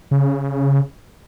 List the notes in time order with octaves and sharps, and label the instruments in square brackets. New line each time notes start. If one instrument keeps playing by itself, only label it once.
[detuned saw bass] C#3